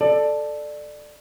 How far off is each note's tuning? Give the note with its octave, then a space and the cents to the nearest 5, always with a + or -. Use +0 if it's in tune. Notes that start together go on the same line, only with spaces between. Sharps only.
A4 +0 D5 +20